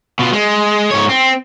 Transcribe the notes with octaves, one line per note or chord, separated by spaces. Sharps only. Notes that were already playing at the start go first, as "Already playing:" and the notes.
B2 F4
G#3
G#2 C#5
C4